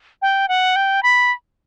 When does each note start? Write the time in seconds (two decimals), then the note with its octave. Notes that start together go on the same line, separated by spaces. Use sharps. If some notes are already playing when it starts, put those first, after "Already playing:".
0.22 G5
0.49 F#5
0.76 G5
1.03 B5